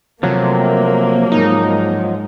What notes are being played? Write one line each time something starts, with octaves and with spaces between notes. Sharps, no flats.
C3 F3 F#3 A3 A#3
G#2 G#3 D#4